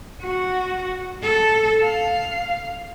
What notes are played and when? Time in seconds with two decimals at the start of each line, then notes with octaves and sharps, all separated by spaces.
0.22 F#4
1.23 A4
1.84 F5